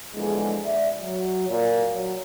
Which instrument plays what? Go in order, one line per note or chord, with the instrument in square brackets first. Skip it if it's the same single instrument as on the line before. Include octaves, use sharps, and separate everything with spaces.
[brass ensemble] A#1 E2 D3 G#3
D5 E5
F#3
A#2
F#3